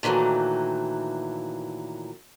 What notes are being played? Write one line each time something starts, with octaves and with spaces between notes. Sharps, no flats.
A#2 D#3 E3 F#3 A3